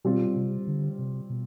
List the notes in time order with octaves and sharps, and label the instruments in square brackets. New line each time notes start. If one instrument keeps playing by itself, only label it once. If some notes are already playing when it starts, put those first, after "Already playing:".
[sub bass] B2 [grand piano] G3 C4 F4
[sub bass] C3
D3
C3
B2